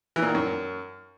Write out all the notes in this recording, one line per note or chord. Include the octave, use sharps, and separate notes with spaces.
E3
A#2
D#3
F#2